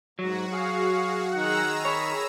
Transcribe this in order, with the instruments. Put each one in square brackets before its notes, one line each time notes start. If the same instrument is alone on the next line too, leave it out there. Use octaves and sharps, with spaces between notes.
[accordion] G#2 [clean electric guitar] F#3 [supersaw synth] F#4
[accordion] G#4 F5 [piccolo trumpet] C#6
[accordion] D#3 [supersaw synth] G#4 A#5 E6 [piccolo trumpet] F#5
[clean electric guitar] C#5 [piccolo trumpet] B5